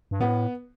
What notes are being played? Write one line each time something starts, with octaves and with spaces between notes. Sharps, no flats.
G2
A2 B3